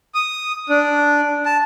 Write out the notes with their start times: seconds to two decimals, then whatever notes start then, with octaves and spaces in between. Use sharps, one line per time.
0.15 D#6
0.69 D4
1.45 A5